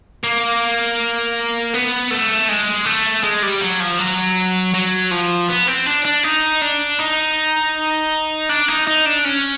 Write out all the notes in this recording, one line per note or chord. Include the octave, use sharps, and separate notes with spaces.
A#3
B3
A3
G#3
A3
G#3
G3
F#3
F3
F#3
F#3
F3
B3
C4
D4
D4
D#4
D4
D#4
D4
D#4
D#4
D4
C#4